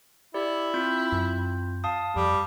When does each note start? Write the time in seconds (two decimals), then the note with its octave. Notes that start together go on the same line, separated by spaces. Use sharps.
0.34 E4 G4 D5
0.74 C4 F4 G6
1.12 F#2
1.84 F5 A5 D#6
2.16 F2 G3